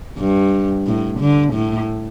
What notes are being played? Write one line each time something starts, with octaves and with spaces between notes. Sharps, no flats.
G2
A2
D3
A2